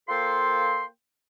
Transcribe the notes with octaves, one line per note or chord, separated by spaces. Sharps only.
A#3 F4 A4 C5 G5 C6